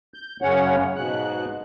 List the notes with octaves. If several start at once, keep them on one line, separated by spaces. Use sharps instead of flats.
G6
F#2 C#3 C#4 C#5 F#5
G#2 B2 F#6